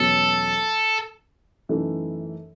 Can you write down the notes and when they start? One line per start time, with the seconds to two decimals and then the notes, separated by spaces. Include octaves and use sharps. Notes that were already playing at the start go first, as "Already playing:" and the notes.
Already playing: E2 B2 F#3 C#4 A4
1.69 F#2 E3 A3 D#4 A4